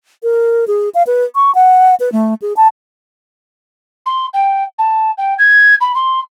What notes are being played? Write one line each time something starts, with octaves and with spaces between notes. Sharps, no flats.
A#4
G#4
F5
B4
C#6
F#5
B4
A3
G#4
A5
C6
G5
A5
G5
G#6
B5
C6